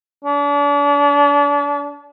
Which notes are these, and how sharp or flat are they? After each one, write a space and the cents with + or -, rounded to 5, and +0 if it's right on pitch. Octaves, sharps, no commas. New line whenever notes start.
D4 -40